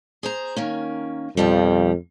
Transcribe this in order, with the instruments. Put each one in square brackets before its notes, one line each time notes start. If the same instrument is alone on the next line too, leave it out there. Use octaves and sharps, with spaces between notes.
[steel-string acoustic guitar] G#4 C5 A#5
D#3 A#3 C#4
[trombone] F2 [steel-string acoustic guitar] B2 F3 G3